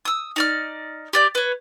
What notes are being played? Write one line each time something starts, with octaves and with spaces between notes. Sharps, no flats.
D#6 E6
D#4 D5 F6
G4 D5 G6
B4 C#5